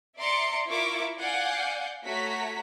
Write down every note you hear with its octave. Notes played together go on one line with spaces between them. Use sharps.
D5 E5 A#5 C6 D6 C#7
E4 F4 A#4 E5 C#6 D6
D5 F5 F#5 G#5 G6
A3 F#4 C#5 A#5 B6